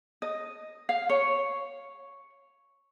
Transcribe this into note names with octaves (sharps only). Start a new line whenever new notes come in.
D#5
F5
C#5